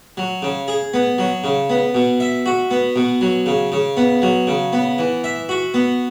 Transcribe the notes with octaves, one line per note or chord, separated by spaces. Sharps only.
F#3
C#3
G#4
B3
F#3
C#3
B3
B2
E5
F#4
B3
B2
F#3
C#3
C#3
B3
F#3
C#3
B3
E3
E5
F#4
B3